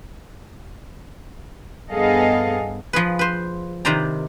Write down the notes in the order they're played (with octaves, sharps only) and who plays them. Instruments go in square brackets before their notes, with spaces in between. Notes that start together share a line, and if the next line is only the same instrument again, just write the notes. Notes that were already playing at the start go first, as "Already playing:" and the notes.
[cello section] G2 B3 G#4 A4 D#5 F5
[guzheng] F3 G#4 B4
B4 C5
C3 D#3 B4 C5 D5 A#5